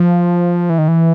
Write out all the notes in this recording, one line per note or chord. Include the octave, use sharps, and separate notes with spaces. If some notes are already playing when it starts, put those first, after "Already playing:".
Already playing: F3
E3
D#3
E3